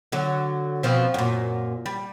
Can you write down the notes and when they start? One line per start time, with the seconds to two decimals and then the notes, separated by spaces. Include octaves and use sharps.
0.12 D3 F#3
0.83 B2 F3 C4
1.14 F#2 A#2
1.86 G3